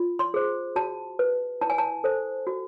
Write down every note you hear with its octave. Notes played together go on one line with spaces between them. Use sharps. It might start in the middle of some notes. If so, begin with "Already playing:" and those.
Already playing: F4
C6
G#4 C5
F#4 A5
B4
E4 A5
G#5
A5
A4 C5
F#4